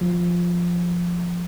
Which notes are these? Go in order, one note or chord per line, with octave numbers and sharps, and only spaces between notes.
F3